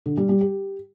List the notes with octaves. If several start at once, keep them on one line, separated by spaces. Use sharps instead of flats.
D3
G3
G3
G4